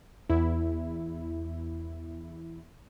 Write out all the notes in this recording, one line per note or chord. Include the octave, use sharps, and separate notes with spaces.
E2 E4